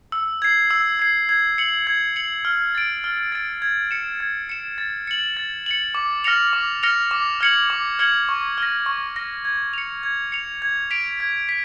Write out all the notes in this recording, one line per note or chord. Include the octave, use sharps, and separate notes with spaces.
E6
G#6 C7
E6
G#6 C7
G#6
C#7 F#7
G#6
C#7 F#7
F6
A6 D7
F6
A6 D7
G#6
C#7 E7
G#6
C#7 E7
A6
C#7 F#7
A6
C#7 F#7
D6
F6 A#6 C#7 F7
D6
F6 A#6 C#7 F7
D6
F6 G#6 C#7 F#7
D6
F6 G#6 C#7 F#7
C#6
F6 A#6
C#6
F6 A#6
G#6
C#7 F7
G#6
C#7 F7
G#6
B6 D7 F7
G#6
B6